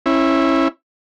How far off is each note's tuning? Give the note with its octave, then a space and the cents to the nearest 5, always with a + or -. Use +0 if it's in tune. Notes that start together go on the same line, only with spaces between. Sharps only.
C#4 -30 E4 +0